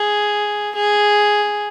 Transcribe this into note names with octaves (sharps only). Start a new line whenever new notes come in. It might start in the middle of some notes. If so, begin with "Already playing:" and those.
Already playing: G#4
G#4